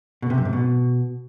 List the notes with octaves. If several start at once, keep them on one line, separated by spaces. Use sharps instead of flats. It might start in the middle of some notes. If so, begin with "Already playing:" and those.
B2
C3
F#2
G#2
B2